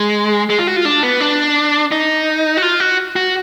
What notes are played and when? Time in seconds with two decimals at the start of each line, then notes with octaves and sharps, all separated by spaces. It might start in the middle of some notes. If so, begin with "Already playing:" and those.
Already playing: G#3
0.50 G#3
0.59 F4
0.67 F#4
0.76 F4
0.85 D4
1.03 B3
1.20 D4
1.92 D#4
2.57 F#4
2.62 F4
2.80 F#4
3.16 F#4